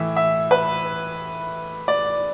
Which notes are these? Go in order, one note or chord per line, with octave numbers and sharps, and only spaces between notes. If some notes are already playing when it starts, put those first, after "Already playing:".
Already playing: A2 E3 E5
E5
B4
D5